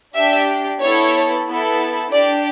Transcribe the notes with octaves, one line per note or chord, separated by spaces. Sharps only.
D4 G4 E5
B3 E4 A4 C#5
B3 E4 A4
D4 G4 D5